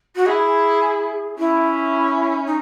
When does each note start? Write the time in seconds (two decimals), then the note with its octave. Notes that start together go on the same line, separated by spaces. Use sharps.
0.15 F#4
0.26 E4 G#4
1.38 C#4 E4
2.46 D#4